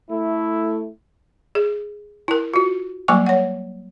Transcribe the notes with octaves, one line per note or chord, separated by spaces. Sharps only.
A3 E4
G#4
E4 A#4
F4 F#4
F#3 G3 A#3 G#5 D6
C#5 F#5